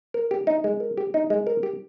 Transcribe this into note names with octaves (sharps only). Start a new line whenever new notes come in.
A#4
G4
D#4
G#3
A#4
G4
D#4
G#3
A#4
G4